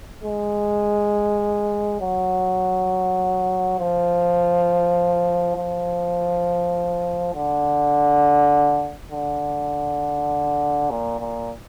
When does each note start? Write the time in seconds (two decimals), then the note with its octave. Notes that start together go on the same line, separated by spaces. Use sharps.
0.24 G#3
2.01 F#3
3.79 F3
5.56 F3
7.35 D3
9.12 D3
10.90 A#2
11.20 A#2